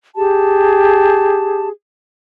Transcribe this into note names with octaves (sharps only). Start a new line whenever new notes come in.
G4 G#4 A5